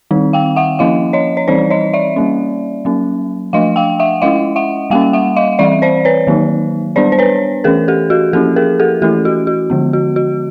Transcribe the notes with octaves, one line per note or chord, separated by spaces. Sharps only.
D#3 G3 C4 D#4
F5 G5
E5 F#5
F3 A#3 C#4 E4 D#5 F5
C#5 D#5
C#5
E3 G3 C4 D#4 C5 D5
C#5 D#5
D5 E5
G3 A#3 C#4
F#3 A#3 C#4
F3 A3 D4 D#5 F5
F5 G5
E5 F#5
G#3 C#4 E4 D#5 F5
E5 F#5
G3 A#3 C#4 F5 G5
E5 F#5
D#5 F5
E3 G3 C4 D5 E5
C5 D5
B4 C#5
D#3 F#3 A#3 D#4
G3 B3 D4 C5 D5
C5
B4 C#5
E3 A3 C#4 G#4 A#4
G4 A4
F#4 G#4
F3 A#3 C#4 E4 G4 A4
G#4 A#4
G4 A4
E3 A3 C#4 E4 G4 A4
F#4
F#4
D3 F3 G#3 B3
F#4
F#4